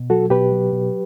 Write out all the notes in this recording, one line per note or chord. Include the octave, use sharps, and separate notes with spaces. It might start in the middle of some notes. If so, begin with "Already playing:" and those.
Already playing: B2
F#3 F#4 A4
B2 G4 B4
F#3
B2